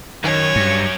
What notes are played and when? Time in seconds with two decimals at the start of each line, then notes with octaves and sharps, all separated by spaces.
0.24 F#2 D#3 C#5
0.56 G2 C#7